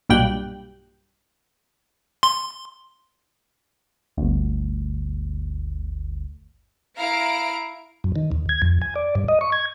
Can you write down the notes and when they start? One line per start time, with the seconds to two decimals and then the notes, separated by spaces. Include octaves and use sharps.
0.09 B1 G2 A#2 G4 F#6 G6
2.23 C6
4.17 G1 D2
6.96 E4 F5 A#5 D7
8.04 F#2
8.16 D#3
8.32 D#2
8.49 G#6
8.62 F2
8.82 G#5
8.96 D5
9.15 G2
9.28 D#5
9.41 C#6
9.52 G#6